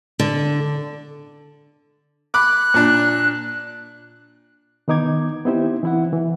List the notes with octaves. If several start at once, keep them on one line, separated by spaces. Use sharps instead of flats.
D3
B5 D6 F#6
A#2 D4
D#3 B3 D#4 D6 G#6
B3 C4 D#4 E4 G4 C5
E3 E4 F#5
E3